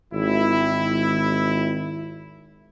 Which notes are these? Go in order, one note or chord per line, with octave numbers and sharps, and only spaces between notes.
G#1 E4